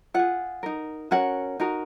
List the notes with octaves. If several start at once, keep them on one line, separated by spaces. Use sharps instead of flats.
F4 G#4 F#5
D#4 A#4
C#4 F#4 A#4 F#5
D#4 F#4 A#4